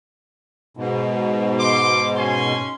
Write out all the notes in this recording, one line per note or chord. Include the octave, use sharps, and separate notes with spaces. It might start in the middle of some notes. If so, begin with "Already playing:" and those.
G#2 B2
C6 D6
C#4 G#5 C6